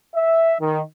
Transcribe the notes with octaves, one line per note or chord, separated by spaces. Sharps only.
E5
D#3